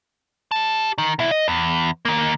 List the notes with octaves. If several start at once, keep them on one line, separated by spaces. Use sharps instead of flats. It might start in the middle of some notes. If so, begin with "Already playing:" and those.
G4 A5
D#3
B2 E4
D#5
E2
D#3 A#3